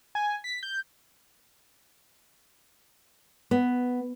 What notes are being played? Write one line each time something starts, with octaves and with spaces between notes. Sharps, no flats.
G#5
B6
G6
B3